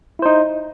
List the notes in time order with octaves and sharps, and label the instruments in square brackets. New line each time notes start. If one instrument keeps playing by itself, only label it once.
[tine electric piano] E4
C5
D#4